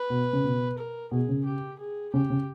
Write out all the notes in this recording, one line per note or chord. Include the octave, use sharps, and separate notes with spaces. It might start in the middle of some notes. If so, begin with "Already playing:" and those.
Already playing: B4
B2
C#3
B2
A#4
B2 G#4
C#3
G4
G#4
C#3 G4
C#3